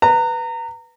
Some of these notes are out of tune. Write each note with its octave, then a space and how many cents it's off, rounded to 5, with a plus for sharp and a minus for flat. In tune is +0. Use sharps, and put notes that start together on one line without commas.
B4 +0 A#5 -25